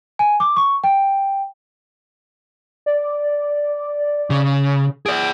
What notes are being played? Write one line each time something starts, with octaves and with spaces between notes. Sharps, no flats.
G#5
D6
C#6
G5
D5
C#3
G#4 D5 D7